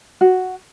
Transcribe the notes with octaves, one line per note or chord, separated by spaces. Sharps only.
F#4